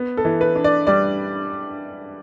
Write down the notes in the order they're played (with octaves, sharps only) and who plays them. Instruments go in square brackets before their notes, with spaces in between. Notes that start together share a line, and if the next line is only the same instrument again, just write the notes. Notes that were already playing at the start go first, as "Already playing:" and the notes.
Already playing: [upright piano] B3
A4
E3
B4
D4
D5
G3 D5